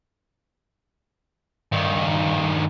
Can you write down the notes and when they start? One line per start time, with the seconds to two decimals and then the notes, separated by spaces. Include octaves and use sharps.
1.72 G2 D#3